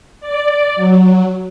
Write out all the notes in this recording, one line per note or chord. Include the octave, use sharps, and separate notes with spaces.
D5
F#3